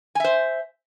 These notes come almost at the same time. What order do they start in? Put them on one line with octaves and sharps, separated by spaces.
G#5 E5 C5